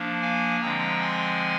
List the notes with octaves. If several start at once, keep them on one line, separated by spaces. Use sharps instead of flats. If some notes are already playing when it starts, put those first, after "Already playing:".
Already playing: F3 A#3 D4
F5 G#5
D3 F3 G#3 C4 G5 A#5
G#5 C6